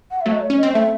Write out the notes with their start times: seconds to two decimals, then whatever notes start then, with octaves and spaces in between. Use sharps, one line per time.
0.11 F#5
0.21 F#3 A3 E5
0.32 D#5
0.41 C#5
0.50 C#4
0.58 C4 D#5
0.74 A3 E5